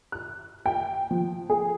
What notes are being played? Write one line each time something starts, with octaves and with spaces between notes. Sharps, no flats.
F#6
G5
F3
G#4